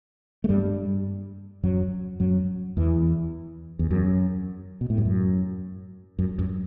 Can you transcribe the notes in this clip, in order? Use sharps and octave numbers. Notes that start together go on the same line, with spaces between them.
A3
G2 G3
F#2 F#3
F#2 F#3
E2 E3
E2
F#2
B2
A2
G2
F#2
F#2
F#2